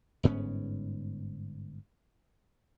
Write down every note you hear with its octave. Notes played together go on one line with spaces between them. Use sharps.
G1 G#2 B3 C#4